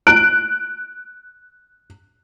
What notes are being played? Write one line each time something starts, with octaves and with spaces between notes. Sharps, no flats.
F#6 D7